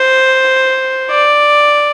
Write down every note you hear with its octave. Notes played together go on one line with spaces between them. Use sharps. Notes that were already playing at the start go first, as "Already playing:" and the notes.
Already playing: C5
D5